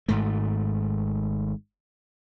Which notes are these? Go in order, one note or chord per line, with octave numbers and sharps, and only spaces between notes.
G#1 G#2 A3